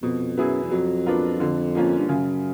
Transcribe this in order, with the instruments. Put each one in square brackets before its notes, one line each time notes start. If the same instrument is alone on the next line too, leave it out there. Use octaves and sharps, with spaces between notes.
[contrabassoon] F2 [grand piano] B2
[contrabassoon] F#2 [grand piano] F#3 B3 E4 G#4
[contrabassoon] E2
[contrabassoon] F2 [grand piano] F#3
[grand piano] B3 D4 F4 A#4
[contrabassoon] F2 [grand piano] D3
[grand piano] F3 A#3 C#4 F4
[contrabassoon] G2
[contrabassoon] F#2 [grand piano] C#3